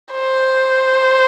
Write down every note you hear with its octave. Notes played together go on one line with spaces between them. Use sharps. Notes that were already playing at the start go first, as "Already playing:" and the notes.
C5